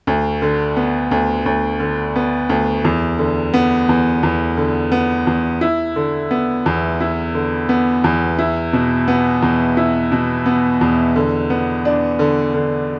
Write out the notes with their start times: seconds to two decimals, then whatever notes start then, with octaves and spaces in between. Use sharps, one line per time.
0.07 D2
0.42 D3
0.77 B3
1.11 D2
1.46 D2
1.80 D3
2.16 B3
2.49 D2
2.85 E2
3.18 D3
3.54 B3
3.89 E2
4.23 E2
4.57 D3
4.92 B3
5.27 E2
5.61 E4
5.96 D3
6.31 B3
6.66 E2
7.00 E4
7.34 D3
7.69 B3
8.04 E2
8.39 E4
8.73 B2
9.08 B3
9.42 E2
9.77 E4
10.12 B2
10.46 B3
10.81 E2
11.16 D3
11.50 B3
11.85 D4
12.19 D3
12.54 D3